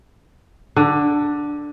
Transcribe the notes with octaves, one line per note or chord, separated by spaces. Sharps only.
D3